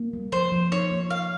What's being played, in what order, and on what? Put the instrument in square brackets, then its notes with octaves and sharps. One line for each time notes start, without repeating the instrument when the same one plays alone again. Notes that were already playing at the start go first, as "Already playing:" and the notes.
Already playing: [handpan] A#3
G3
[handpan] F3 [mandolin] C5
[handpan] F3
[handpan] D#4 [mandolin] C#5
[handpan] A#3
[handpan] F3 [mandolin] F5